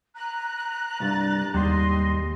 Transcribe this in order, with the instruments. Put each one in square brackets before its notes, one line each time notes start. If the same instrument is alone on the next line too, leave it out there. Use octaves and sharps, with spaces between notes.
[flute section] A#5 F#6
[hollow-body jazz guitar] C2 G2 [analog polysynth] D4 A6
[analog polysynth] D#2 [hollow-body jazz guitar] G#2 G3 [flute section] D#5 C6